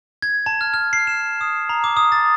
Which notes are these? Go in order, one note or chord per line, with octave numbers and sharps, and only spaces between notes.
G#6
A5
F6
F6
C7
E7
D#6
A#5
D6
D#6
A6